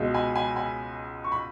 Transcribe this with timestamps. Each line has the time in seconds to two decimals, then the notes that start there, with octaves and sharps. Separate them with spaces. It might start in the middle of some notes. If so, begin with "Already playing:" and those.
Already playing: C#2 B2 G#3
0.14 G#5 B5
0.35 G#5 B5
0.56 G#5 B5
1.24 C#6
1.32 B5